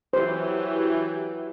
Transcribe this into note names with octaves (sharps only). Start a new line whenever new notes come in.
E3 F#3 G4 C5